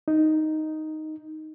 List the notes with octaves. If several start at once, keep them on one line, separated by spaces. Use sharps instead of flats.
D#4